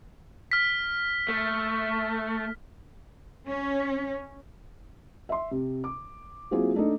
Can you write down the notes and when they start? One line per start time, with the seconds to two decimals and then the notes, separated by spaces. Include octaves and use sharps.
0.51 F6 B6
1.28 A3
3.47 C#4
5.29 E5 C6
5.51 C3
5.84 D6
6.51 F#3 A#3 C4 E4 F4 G#4
6.75 A3 D4 D#4 A4 D#5